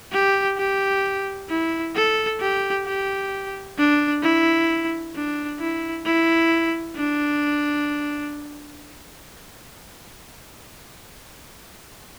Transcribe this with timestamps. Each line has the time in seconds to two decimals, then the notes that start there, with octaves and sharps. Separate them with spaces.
0.13 G4
0.58 G4
1.49 E4
1.95 A4
2.40 G4
2.85 G4
3.78 D4
4.23 E4
5.15 D4
5.60 E4
6.06 E4
6.96 D4